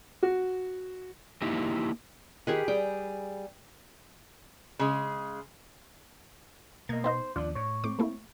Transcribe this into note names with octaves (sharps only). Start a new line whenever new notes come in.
F#4
A#3 D#4 E4 G4 D#5 E5
D#3 G4 G#4 B4
G3 G#4 G5
C#3 G#3
B2 A#3 D#5 G#6
B3 D#4 C5 D#5
D#2 F3 D4 F4
A2 C#5
A2 C4 D6
A3 A#3 E4